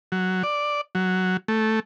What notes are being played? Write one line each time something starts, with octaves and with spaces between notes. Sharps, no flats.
F#3
D5
F#3
A3